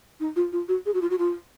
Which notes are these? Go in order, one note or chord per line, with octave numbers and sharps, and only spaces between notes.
D#4
F4
F4
F#4
G#4
F#4
F4
F#4
F4